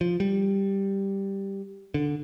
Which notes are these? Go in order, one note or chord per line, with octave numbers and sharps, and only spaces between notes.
F3
G3
D3